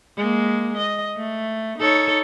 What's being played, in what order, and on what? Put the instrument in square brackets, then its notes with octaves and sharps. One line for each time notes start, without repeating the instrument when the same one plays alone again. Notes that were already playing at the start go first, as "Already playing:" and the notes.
[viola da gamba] G#3 A#3
D#5
A3
D#4 A4 C#5